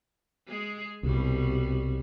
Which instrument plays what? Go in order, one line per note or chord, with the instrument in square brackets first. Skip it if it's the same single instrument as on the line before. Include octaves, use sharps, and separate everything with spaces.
[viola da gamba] G#3 G#4
[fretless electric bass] C2 [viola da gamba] B2 G3 F#4